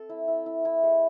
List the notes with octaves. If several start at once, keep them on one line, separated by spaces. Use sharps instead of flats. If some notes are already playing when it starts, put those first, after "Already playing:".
Already playing: C4 A4
E4
E4
E4
E4
G#3